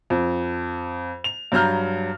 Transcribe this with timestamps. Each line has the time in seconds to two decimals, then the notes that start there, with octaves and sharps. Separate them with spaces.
0.10 F2
1.24 F7
1.52 G2 F#3 A#5 F6 G6